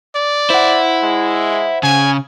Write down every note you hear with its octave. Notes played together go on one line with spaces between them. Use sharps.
D5
E4 C5 F#5
G#3
C#3 G#5